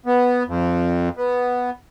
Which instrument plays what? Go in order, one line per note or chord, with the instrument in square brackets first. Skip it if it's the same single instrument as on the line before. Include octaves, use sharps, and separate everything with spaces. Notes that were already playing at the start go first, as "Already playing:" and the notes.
[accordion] B3
F2
B3